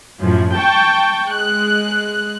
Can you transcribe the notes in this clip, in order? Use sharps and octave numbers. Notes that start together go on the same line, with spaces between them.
F#2 A2 F3
G5 A5 C#6
G#3 F#6